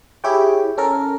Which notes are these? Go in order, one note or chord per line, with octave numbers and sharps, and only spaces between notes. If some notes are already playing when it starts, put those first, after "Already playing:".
E4 G4 G#4 C#5 G5
C#4 A4 A#4